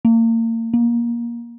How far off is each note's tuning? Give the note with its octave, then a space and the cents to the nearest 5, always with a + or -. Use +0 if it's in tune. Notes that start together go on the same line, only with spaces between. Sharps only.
A#3 -35
A#3 +20